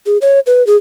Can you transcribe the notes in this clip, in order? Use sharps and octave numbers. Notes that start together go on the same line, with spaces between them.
G#4
C#5
B4
G#4